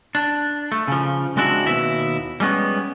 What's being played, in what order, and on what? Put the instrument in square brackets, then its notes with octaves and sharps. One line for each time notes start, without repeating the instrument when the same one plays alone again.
[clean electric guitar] D4
A3
C#3 F3
G#3 C4 D4 E4 F#4
D#2 B2 E4 E5
G3 G#3 B3 C#4